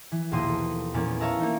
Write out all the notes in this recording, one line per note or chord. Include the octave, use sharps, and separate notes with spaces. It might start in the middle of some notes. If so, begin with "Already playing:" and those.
E3
A#1 D#2 B2 C6 D#6
A4
E2 A#2 A#3 B3 C#4
C#5 E5 F5 A5 A#5 E6
A#3 D#4